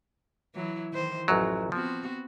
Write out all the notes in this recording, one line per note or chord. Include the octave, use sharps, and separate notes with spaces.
E3 F#3 E4
D#3 E3 C5
A1 F#2 F3 F#3
F3 B3 C4 F#4